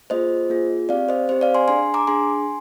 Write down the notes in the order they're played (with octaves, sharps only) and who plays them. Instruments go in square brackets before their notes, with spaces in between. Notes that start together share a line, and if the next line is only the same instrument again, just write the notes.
[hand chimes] A#3 F4 G#4 C5 D#5
A#3 F4 G#4
C4 G4 D5 F5
C5 D#5
C4 G4 C5
D5 F5
G#5 C6
D4 G#4 G#5 C6
A#5 D6
D4 G#4 G#5 C6